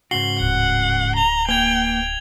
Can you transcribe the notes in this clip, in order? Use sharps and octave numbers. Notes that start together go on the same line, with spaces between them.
G#2 C#3 F#4 C7 F#7 G7
D1 F#5
A#5 F7 G7
A#3 B4 G5 G#5 G#6 F7 G7